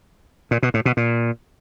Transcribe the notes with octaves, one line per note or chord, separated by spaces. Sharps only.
A#2
B2
A2
B2
A#2